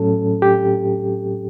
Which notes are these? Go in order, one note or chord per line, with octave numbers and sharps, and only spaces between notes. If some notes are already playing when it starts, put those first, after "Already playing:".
Already playing: A2 F#3 C#4 A4
G4